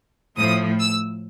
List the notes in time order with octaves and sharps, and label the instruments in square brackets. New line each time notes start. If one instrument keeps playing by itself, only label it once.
[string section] A2 F3 D#6
E6